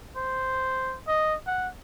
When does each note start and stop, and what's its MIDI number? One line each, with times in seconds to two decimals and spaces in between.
0.16 0.97 72
1.08 1.36 75
1.47 1.68 78